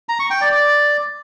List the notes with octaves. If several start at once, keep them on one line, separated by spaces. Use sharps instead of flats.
A#5
C#6
G5
D5
D5